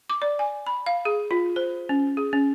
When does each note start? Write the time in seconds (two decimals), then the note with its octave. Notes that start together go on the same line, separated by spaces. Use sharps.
0.10 D6
0.22 D5
0.39 G#5
0.67 B5
0.86 F5
1.05 G#4
1.31 F4
1.56 C5
1.89 C#4
2.17 G#4
2.33 C#4